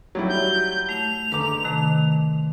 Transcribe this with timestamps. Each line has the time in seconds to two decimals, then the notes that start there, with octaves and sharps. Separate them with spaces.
0.15 F#3 G3 E4
0.29 G6
0.89 A3 F7
1.32 D3 B4 A#5 D6
1.64 C3 D#3 A3